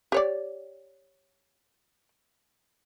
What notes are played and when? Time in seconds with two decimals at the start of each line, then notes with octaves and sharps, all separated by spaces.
0.12 G4 C#5 D5